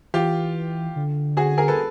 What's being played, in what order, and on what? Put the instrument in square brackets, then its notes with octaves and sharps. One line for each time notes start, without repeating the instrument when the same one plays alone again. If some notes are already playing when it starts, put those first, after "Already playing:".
[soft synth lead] E3 [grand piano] F4 G4
[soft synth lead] D3
[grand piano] F#4 G#4
G#4 A#4
A4 B4